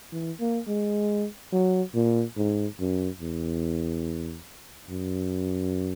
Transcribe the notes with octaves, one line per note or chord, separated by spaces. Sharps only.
E3
A#3
G#3
F#3
A#2
G#2
F#2
E2
F#2